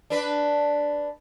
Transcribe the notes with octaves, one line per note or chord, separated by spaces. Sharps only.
D4 B4